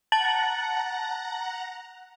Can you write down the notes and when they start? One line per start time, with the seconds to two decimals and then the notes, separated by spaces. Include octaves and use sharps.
0.12 F#5 A5 A#5 A6 F#7